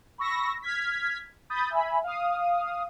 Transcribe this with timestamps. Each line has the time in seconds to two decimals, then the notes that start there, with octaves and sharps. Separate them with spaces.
0.18 B5 C#6 E6 A#6
0.62 F6 G#6 B6
1.50 B5 D#6 G6 A6
1.70 E5 G#5 B5
2.04 F5 D#6